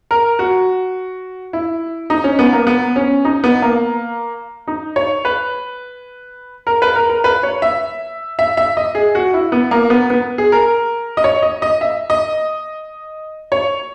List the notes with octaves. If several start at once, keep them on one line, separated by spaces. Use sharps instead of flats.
A#4
F#4
E4
D#4
C#4
B3
A#3
B3
C#4
D#4
B3
A#3
D#4
C#5
B4
A#4
B4
A#4
A#4
B4
C#5
E5
E5
E5
D#5
G#4
F#4
E4
B3
A#3
B3
B3
G#4
A#4
D#5
C#5
D#5
D#5
E5
D#5
C#5